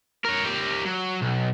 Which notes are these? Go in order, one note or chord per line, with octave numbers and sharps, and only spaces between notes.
A#4 C#5
G4 A#4
F#3
B1